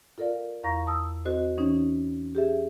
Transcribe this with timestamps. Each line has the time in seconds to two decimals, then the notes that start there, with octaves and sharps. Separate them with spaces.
0.18 F4 A4 A#4 D5 F5
0.63 E2 F5 A#5 C#6 A#6
0.86 A5 D#6 E6
1.25 C4 F#4 A4 C5 D#5
1.57 E3 C#4 D#4 C#5
2.35 G4 G#4 E5